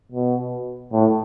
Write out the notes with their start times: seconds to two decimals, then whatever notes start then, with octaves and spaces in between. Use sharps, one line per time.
0.12 B2
0.93 A2